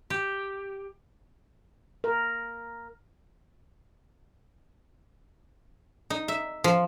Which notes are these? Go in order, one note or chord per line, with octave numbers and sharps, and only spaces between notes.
G4
A#4
D#4
E5
F3